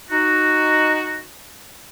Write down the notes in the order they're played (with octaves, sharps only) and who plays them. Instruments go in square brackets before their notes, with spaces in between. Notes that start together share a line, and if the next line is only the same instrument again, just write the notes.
[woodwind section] D#4 F#4